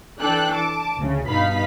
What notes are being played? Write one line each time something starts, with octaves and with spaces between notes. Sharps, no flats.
E3 D4 A4 G5 F#6
A5 D6
D2 C#3
G2 B2 D#4 F5 B5 B6